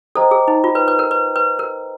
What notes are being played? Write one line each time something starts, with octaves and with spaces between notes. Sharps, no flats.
A4 C5 D#5 G5 A#5
G#4
D#4
F4
B4
B4
A#4
B4
B4
A#4